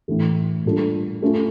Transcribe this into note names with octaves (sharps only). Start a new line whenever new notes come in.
A2 E3 A3
A#2 G3 D4 F4 A4
A3 C#4 F4